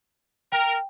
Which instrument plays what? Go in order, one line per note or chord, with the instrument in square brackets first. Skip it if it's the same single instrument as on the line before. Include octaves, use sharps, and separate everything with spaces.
[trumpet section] A#4 [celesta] G5